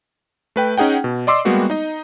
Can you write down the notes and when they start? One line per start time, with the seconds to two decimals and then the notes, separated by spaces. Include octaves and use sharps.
0.56 A3 B4 G5
0.78 C#4 D#4 G#4 F#5 G5
1.04 B2
1.27 D5 D#5 C6 D6 E6 C7
1.45 G3 G#3 A#3 B3 F#4 G4
1.70 D#4 D#5